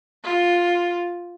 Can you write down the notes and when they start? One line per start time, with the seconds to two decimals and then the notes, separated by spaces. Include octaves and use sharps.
0.24 F4